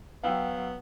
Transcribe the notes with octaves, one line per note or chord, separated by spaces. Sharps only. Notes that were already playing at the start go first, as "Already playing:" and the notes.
F#3 B3 F5 G5 E6